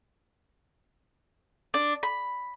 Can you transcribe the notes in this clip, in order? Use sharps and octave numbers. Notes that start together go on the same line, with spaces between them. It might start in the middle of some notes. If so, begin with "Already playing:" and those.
D4
B5